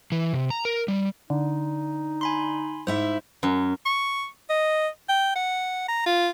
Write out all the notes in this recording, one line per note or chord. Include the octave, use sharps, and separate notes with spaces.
E3
C3
A#5
A#4
G3
D3 D#4
G#5 B5 C6
G#2 E4 C5 E5
F#2
C#6
D#5
G5
F#5
A#5
F4